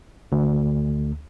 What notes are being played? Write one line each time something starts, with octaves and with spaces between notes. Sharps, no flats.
D2